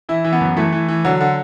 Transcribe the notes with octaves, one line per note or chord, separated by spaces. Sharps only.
E3 E4
E3
B3
F#2
E3 A3
E3
E3
D3 F#3
D3